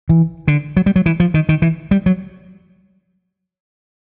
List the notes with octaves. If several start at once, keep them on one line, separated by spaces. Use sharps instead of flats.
E3
D3
F#3
G3
F#3
E3
F3
D#3
D#3
E3
G3
F#3